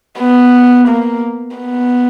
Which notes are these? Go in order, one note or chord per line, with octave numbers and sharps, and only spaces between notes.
B3
A#3
B3